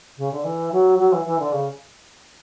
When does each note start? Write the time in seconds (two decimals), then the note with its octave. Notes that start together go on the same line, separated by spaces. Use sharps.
0.17 C#3
0.32 D3
0.44 E3
0.72 F#3
0.98 F#3
1.12 E3
1.25 E3
1.39 D3
1.52 C#3